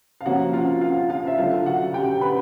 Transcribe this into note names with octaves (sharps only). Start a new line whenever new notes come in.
F5
C3 F3 A#3 C#4 F#4 F#5
F4 F5
F4 F5
F4 F5
E5
D3 F#3 A3 D4 F4 F5
F#4 F#5
G4 G5
B4 B5